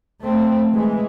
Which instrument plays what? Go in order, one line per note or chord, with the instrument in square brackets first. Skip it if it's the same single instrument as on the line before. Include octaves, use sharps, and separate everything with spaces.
[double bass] A3 C4
E3 G#3